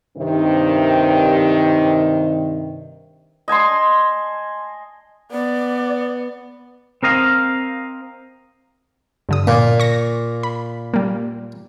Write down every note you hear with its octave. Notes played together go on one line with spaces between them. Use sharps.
G2 C3 D#3
D#5 G#5 A5 C6
B3 D5
C4 A#4 D#5 F5
G2 D3 D#6
A#2
C#6 A#6
B5
G3 A#3